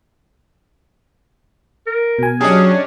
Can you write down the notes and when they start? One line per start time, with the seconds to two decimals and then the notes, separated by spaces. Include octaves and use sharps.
1.87 A#4
2.19 B2 G#5
2.41 F#3 C#4 D4 G4 G#4 D#5